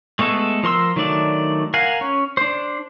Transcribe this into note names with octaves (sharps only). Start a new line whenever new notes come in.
G#3 A3 B3 A4
F3 A#4 C6 E6
D#3 F#3 A3 D4 D5
A#4 F5 F#5 G#5
C#4
D4 C5